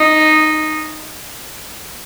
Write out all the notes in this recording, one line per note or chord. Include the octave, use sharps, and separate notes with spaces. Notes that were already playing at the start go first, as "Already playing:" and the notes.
Already playing: D#4